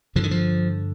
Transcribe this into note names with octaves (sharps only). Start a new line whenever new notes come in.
G2 D3 F3
D#3
F3